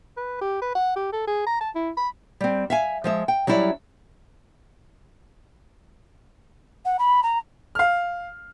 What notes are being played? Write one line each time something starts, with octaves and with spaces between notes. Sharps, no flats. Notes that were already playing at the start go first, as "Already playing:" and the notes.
B4
G4
B4
F#5
G4
A4
G#4
A#5
A5
E4
B5
G3 C4
E5 F5 G#5
F3 G#3 E5
G5
F#3 G3 C#4 E4 D5
F#5
B5
A#5
F5 F6